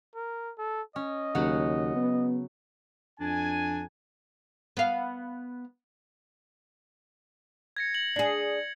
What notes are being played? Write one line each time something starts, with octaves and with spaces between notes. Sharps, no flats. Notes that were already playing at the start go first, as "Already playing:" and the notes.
A#4
A4
C#4 D#5
D#2 C#3 F#3 F#5
B3
F2 D4 G#5
B3 F5
G#6 A#6 C#7
F#7
D4 G#4